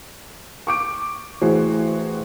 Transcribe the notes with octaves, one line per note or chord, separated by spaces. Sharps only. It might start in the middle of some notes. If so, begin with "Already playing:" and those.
C#6 D6 D7
A1 E3 F#4 G#4 C5